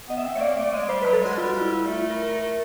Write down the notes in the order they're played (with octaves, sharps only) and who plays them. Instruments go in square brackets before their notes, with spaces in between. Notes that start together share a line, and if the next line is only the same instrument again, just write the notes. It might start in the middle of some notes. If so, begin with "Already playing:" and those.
[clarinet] B3 [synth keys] D#5
[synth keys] E5
[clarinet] C4
[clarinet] A3 [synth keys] C#5
[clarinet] A#3 [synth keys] D5
[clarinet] A3
[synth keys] D5
[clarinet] G#3 [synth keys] D#5
[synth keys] D5
[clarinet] G3 [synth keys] C5
[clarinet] F#3 [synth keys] B4
[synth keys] A4
[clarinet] G#3 [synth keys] F#4
[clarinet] G3 [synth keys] F4
[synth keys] F#4
F4
E4
[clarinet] A3 [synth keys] F4
[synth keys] A#4
A#4
A#4